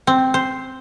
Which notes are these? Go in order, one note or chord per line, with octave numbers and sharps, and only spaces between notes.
C4
C5